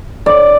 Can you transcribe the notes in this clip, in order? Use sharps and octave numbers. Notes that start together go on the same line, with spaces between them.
D5